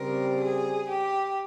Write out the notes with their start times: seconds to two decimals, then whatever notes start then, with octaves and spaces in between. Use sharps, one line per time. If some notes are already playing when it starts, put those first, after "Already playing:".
Already playing: C#3 G3 C4 A#4
0.40 G#4
0.89 G4